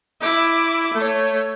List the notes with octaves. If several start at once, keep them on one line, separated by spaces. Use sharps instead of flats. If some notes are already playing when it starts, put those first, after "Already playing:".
E4 D6
A3 C#5